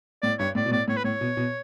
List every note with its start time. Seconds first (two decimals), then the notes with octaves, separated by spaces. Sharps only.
0.22 A2 D5
0.39 G2 C#5
0.55 A2 D5
0.66 B2
0.71 A2 D5
0.88 A2 C#5
0.97 B4
1.04 A2 C#5
1.21 B2
1.37 B2